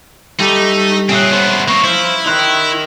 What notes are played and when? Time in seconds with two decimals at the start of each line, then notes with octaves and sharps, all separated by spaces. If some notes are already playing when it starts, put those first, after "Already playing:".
0.40 G3 A3 D#4 G4
1.09 A#2 C4 C#4 G#4 E5 F#6
1.33 B3 D4 B4 C5
1.68 A#3 C4 C#5
1.84 E4 C5 F5
2.26 D#4 A#4 E5 C6 F#6